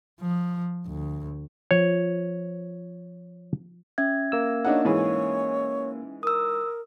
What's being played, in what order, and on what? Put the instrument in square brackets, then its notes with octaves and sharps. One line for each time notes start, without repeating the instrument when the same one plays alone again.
[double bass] F3
D2
[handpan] F3 [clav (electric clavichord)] C#5
[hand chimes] C#4 E5 G#6
[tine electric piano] A#3 E6
[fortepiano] D4 D#4 F#5 [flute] C#5
[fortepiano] G#2 E3 G#4 [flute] C#5
[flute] A#4 [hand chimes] D#6 E6